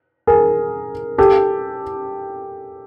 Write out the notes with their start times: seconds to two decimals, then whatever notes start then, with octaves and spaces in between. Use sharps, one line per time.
0.27 G#4 A#4
1.18 G4 A4